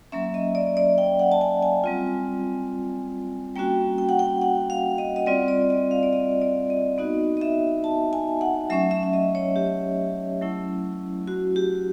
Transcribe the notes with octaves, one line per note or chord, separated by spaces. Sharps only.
F#3 A#3 C#4 E5
D#5
D5
D5
G5
F#5
A5
G#5
G#5
G3 C4 F4
G3 A#3 C#4 F#4 G5
G5
F#5
G5
F#5
F5
D#5
D#5
G3 C4 F4 D5
D5
D#5
F5
D5
D#5
D5
D#5
B3 D#4 F#4 D#5
D#5
E5
A5
G#5
F#5
F#3 A3 C#4 E5
E5
E5
D#5
C#5
G4
F#3 A3 C#4 E4
F#4
G4